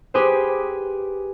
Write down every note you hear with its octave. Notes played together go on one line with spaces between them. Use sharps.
G4 G#4 B4 C5